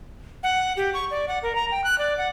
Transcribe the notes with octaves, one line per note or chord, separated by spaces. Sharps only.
F#5
G4
C#6
D5
F#5
A#4
A#5
G5
F#6
D5
F#5